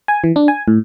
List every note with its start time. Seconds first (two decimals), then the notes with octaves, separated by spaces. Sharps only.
0.08 G#5
0.24 E3
0.36 D4
0.48 G#5
0.68 A2